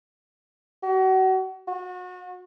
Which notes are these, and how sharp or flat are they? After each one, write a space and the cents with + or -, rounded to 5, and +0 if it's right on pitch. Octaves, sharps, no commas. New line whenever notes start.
F#4 +35
F#4 -30